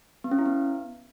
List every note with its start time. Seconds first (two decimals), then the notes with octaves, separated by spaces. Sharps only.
0.24 B3
0.31 C#4
0.39 E4
0.46 B3